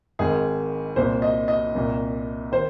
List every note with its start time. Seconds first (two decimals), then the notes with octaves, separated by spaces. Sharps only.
0.19 G#1 G#2 D#3 G#4
0.96 C2 A#2 C5
1.22 D#5
1.48 D#5
1.75 C2 A#2
2.52 D#3 C5